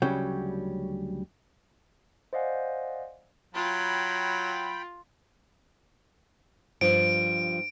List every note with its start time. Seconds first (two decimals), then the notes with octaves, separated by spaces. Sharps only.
0.02 D2 C#3 F#3 G3 C#4 G5
2.33 C5 D5 D#5 F5 F#5 G#5
3.55 F#3 F4 G5 B5
6.81 G2 F3 D7